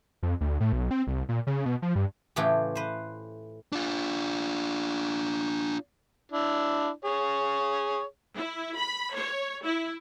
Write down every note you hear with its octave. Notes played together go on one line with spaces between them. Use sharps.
F2
D2
A2
B1
C4
C2
A#2
C#3
B2
F3
G2
A2 C#3 E3 A3 F4 G4
B4 C5
D4 F4
D4 E4
G#4 C#5
E4
B5
C#5
E4